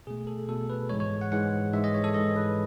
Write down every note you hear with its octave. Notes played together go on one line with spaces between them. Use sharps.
B2 A3 G#4
A4
B2 A3 A4
B4
G#2 E3 G#3 C#5
C#5
F#5
G#2 E3 G#3 F#5
G#2 E3 G#3 E5
D#5
C#5
A4
G#2 E3 G#3 D#5
B4